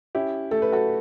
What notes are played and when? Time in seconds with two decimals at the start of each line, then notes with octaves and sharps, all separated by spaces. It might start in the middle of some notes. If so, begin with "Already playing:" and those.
0.15 C#4 E4 G4
0.51 A3 A4
0.62 B4
0.72 F#4 A4